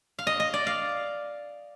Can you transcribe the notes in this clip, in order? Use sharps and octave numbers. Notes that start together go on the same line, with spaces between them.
F5
D#5
D#5
D5
F5